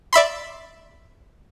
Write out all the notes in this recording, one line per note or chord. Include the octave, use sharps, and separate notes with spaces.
D5 E5 B5 C6